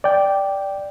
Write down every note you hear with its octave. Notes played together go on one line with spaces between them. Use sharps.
D5 G5